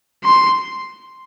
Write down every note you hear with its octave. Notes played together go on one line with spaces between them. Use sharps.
C6